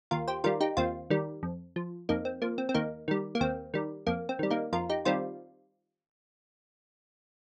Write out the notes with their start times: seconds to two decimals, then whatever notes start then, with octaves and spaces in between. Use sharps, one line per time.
0.11 D#2 F4 A#4
0.28 G4 C5
0.44 D#3 G3 F4 A#4
0.61 D#4 G4
0.77 D#2 C4 F4
1.10 D#3 G3
1.43 F2
1.76 F3
2.09 F2 A#3 D#4
2.25 C4
2.42 F3 A#3
2.58 C4
2.69 C4
2.74 D#2 A#3 D#4
3.08 D#3 G3
3.35 A#3
3.41 D#2 C4
3.74 D#3 G3
4.07 F2 A#3
4.29 C4
4.39 D#3 G3
4.50 A#3 D#4
4.73 F2 F4 A#4
4.89 D#4 G4
5.05 D#3 G3 C4 F4